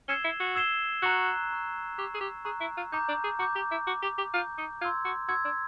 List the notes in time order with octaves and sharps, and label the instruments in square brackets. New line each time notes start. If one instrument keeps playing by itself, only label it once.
[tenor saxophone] C#4 [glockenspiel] E6 G#6 C7 E7 G7
[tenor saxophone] E4
F#4
[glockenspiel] E6 G#6 C7 E7 G7
[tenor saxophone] F#4 [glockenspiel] A#5 C#6 F#6
[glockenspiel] A#5 C#6 F#6
[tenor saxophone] G4 [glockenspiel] A#5 C#6 F#6
[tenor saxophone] G#4
G4
[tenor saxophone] G#4 [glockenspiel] A#5 C#6 F#6
[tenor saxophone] E4
F4
[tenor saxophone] D#4 [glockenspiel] A#5 D6 G6
[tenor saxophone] D4
G#4
[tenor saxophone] F#4 [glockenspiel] A#5 D6 G6
[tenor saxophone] G4
E4
[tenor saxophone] F#4 [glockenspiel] A#5 D6 G6
[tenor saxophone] G4
G4
[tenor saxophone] F4 [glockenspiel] A#5 D6 G6
[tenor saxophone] D#4
[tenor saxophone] F4 [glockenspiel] G#6
[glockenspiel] C6 E6
[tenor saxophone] F#4
[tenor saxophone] F#4 [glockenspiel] C6 E6 G#6
[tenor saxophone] D4